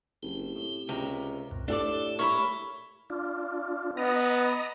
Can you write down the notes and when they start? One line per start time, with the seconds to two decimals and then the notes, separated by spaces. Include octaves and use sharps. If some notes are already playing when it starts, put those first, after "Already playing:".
0.23 F#1 C4 E4 G4
0.55 A2
0.89 C#2 C3 A#4
1.51 C2 F#2 A#2
1.68 A2 A3 D4 G4 A4 D5
2.19 E4 A#4 C#5 B5
3.10 D4 F4
3.97 B3 D#5 A#5